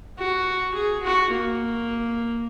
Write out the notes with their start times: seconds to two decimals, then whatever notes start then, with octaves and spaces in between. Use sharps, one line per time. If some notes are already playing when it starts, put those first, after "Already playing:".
0.18 F#4
0.74 G#4
1.02 F#4
1.30 A#3